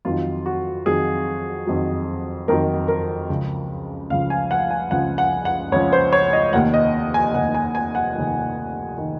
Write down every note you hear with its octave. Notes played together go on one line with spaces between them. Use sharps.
F2 D#3 F#3 F4
F#4
F2 D#3 F#3 G#4
F2 D#3 F#3
F2 D#3 F#3 A#4
A#4
C#2 C#3 F3
C#2 C#3 F3 F5
G#5
F#5
G#5
C#2 C#3 F3 F#5
F#5
F#5
C#2 C#3 F3 C#5
C5
C#5
D#5
F1 D#2 D#3 F#5
D#5
G#5
F1 D#2 D#3 F#5
G#5
G#5
F#5
F1 D#2 D#3
D#3